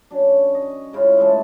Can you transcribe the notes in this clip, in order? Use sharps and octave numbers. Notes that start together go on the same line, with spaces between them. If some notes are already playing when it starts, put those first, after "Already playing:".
F#3 C#4 D4
D#5
G#2 C#3 E4 F4
A2 E3 G#3 A5